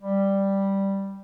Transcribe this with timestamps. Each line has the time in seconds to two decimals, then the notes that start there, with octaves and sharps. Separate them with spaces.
0.02 G3